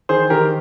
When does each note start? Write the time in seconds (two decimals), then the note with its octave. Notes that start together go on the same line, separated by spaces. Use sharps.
0.09 D#3 G#4 C5
0.30 D#3 G4 A#4